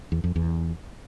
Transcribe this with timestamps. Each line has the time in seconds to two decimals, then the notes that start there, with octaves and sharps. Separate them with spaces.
0.12 E2
0.24 F2
0.36 E2